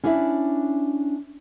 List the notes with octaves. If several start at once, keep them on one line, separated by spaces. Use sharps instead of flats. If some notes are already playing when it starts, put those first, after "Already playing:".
C#4 D4 E4 E5